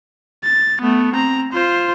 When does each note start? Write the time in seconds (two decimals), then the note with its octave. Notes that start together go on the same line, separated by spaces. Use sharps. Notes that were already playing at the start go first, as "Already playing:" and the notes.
0.44 A6
0.81 A3 B3
1.14 C4 A#5
1.52 F4 C5